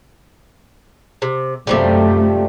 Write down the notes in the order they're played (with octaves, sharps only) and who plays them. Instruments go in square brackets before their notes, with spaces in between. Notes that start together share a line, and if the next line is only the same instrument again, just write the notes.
[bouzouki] C3
[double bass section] F#2 A3 [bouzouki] C3 F3 G3